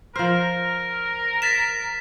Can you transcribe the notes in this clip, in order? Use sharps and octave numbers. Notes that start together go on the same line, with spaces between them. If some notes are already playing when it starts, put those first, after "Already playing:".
F3 A#4 C5 F6
A6 B6 E7